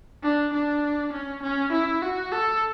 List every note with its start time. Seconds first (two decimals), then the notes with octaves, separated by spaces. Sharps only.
0.23 D4
0.53 D4
1.13 C#4
1.42 C#4
1.72 E4
2.02 F#4
2.32 A4